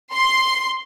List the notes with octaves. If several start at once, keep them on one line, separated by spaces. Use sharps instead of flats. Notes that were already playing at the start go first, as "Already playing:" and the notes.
C6